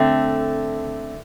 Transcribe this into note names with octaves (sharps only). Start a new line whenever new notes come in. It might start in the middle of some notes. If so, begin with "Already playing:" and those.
Already playing: D3 A3 C4